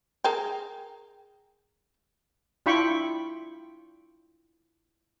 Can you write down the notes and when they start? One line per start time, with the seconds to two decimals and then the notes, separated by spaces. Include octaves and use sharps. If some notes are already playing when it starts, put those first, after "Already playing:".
0.24 G#4 A#4 G5
2.66 D4 E4 F4 G5 B5 C#6